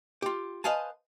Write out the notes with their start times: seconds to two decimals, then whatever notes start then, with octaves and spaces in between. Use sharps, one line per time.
0.22 F4 G4
0.64 B4 C5 D#5 F5 G#5 A5